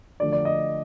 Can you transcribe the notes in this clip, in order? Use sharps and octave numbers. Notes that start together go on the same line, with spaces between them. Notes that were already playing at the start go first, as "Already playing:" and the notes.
D3 F3 A3 D4 D5
D5
D#5